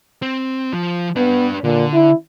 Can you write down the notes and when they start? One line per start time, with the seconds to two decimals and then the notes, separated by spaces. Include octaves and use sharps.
0.22 C4
0.73 F3
1.16 B3 D4 B4
1.64 A#2 D3
1.93 E4